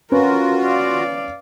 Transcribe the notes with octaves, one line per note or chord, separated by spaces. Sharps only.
C#4 F4 F#4 A#4 B4
D5 F5